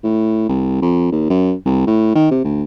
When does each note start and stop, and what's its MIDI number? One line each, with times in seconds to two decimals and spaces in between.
0.04 0.45 45
0.49 0.78 36
0.82 1.10 41
1.12 1.25 39
1.30 1.53 42
1.66 1.86 36
1.87 2.12 45
2.15 2.28 51
2.31 2.44 48
2.44 2.64 38